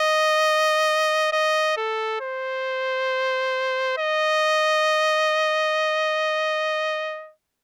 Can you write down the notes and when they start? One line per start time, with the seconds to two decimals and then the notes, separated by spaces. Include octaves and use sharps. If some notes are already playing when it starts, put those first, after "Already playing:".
Already playing: D#5
1.33 D#5
1.77 A4
2.21 C5
3.98 D#5